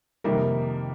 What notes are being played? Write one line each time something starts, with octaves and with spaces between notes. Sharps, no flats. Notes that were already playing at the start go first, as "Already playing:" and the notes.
F2 C3 D#3 G3 A#3 A#4